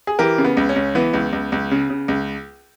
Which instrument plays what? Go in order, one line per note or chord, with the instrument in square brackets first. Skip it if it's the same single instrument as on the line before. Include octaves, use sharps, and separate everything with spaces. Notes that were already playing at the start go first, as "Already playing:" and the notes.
[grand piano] G#4
E3 G4 A#4
C#3
B3
C#2
C#4
C#2
E3 B3
C#2
C#2
C#2
C#3
C#3
C#2